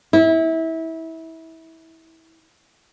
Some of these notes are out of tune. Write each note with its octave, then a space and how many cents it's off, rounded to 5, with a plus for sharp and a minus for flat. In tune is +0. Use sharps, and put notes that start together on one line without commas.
E4 -25